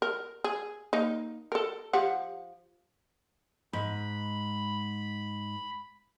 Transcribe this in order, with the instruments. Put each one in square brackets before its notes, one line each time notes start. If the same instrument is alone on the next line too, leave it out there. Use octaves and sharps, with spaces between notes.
[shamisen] A#4
G#4
A#3 D#4
A4 A#4
F3 G4 F#5
[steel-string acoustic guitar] G#2 [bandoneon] B5